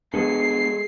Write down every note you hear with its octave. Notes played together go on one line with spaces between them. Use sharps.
G#3 B3 D4 G#4 A4 C7